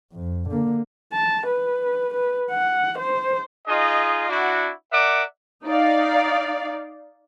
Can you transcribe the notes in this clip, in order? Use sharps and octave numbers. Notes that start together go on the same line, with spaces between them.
F2
D3 A#3
A5
B4
B4
F#5
C5
D#4 F4 G#4 D#5
D4 E4 F#4
A#4 D5 E5 F#5 D6
D#4 D5 F5